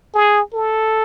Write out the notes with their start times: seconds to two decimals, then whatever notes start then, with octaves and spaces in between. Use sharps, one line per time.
0.14 G#4
0.53 A4